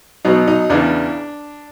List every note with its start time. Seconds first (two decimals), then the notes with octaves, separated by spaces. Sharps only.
0.25 B2 F#3 B3 D#4
0.48 D#4
0.70 E2 C#3 E3 D4